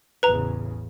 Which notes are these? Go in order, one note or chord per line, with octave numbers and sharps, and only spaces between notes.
A1 E2 C#3 B4 A#5